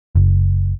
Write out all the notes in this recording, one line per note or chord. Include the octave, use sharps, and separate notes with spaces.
F#1